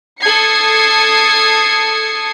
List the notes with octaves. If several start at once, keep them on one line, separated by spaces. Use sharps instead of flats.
A4 D#6 G#6 C7 C#7